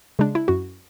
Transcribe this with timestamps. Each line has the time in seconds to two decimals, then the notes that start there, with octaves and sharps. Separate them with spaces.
0.19 C#3 G#3 D4
0.35 E4
0.48 F#2 F#4